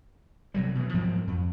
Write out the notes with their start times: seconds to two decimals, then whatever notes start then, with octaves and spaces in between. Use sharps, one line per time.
0.54 C3 F#3 G3
0.75 B2 E3
0.94 G#2 F3 F#3 C4
1.27 F2